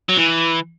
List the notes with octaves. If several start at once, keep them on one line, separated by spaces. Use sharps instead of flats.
F#3
E3